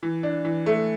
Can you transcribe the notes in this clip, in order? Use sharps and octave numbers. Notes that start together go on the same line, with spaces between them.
E3
D4
E3
A3